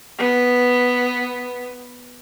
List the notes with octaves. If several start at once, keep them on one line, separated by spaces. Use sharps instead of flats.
B3